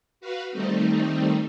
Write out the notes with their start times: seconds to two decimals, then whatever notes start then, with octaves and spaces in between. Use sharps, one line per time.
0.21 F#4 B4 F5
0.50 D#3 G3 A3 C4 D#4